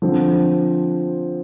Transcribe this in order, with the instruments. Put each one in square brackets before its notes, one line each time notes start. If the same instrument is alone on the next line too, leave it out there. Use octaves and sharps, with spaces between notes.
[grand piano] D3 F3 C4